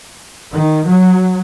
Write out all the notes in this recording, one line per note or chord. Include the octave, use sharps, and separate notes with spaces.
D#3
F#3